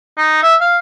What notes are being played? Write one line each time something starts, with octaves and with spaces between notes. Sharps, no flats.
D#4
E5
F5